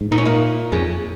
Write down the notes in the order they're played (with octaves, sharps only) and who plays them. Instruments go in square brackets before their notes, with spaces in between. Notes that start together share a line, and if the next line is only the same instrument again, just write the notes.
[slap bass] G#2
[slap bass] A#2 [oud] D#4
[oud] C#4
A#3 D#4
[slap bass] F2 [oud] G#3 C#4